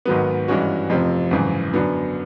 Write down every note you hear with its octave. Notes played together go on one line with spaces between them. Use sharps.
G#1 G#2 D#3 F#3 B3
G2 E3 G#3 C#4 F#4
F1 F2 C3 F3
G#1 F#2 C#3 E3
F#2 D3 F#3 B3